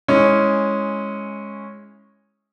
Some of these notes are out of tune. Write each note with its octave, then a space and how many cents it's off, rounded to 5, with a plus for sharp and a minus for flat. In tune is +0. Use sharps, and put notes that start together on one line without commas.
G#3 +0 C#4 -10 E4 -20